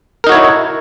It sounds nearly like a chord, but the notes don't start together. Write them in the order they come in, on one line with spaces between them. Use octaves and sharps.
A#4 D#4 F#4 C#5 E4